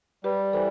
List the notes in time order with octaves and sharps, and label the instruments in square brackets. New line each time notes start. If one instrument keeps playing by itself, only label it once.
[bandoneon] G3 [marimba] G4 B4
[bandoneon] E3 [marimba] A4 C5